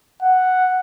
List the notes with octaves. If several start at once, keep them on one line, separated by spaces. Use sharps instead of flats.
F#5